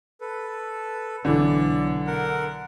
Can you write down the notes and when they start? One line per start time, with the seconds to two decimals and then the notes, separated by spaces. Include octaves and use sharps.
0.21 A4 B4
1.25 B1 D3 E3 D5
2.07 A#4 F#5